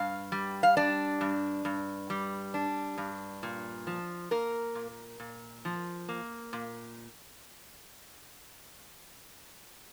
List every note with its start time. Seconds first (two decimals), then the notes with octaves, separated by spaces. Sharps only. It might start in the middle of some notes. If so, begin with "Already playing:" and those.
Already playing: G2 F5
0.32 G3
0.63 F5
0.77 D4 D5
1.21 G2
1.65 G2
2.10 G3
2.54 D4
2.98 G2
3.43 A#2
3.87 F3
4.31 A#3 A#4
4.75 A#2
5.20 A#2
5.65 F3
6.09 A#3
6.53 A#2